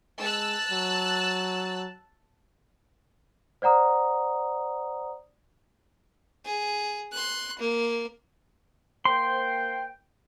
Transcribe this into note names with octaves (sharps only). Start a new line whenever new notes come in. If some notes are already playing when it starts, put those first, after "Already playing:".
G#3 A5 E6 F#6
F#3
C5 D5 F#5 A#5 D#6
G#4
C6 F#6
A#3
A#3 C5 G5 C6